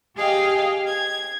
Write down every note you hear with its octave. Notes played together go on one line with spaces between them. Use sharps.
G4 G#4 D#5 F5 G5
G#6